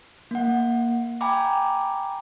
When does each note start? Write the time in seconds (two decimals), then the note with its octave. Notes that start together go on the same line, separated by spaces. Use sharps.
0.31 A#3 F#5
1.21 G5 G#5 A#5 B5 D6